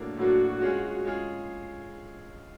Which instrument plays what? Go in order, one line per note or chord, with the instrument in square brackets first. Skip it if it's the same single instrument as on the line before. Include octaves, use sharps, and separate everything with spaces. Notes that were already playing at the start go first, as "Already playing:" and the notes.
Already playing: [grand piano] A2 F#3 A#3 D4
[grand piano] A2 F#3 A#3 D4 [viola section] F#4
[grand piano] G#3 C#4 F4 G#4
G#3 C#4 F4 G#4